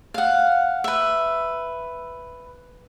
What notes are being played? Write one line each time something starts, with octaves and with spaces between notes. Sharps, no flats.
F5 F#5
B4 E5